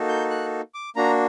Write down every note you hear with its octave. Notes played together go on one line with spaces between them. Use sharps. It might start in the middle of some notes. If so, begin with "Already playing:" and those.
Already playing: A#3 D#4 F#4 A4
G6
F#6
D6
A#3 D4 F#4 A#5